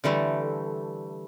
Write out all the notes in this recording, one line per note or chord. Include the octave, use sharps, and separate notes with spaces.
D3 E3 G3 A3